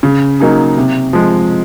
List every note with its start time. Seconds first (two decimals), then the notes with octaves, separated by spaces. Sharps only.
0.03 C#3
0.40 F#3 A#3 D#4 G#4
0.77 C3
1.13 F3 G#3